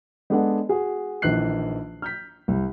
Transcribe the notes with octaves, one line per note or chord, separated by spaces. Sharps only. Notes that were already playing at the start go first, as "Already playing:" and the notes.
G#3 B3 D4 A4 D#5 F#5
F#4 G#4
A#1 D#3 E3 D#4 F#6 C7
F6 G6 B6
C2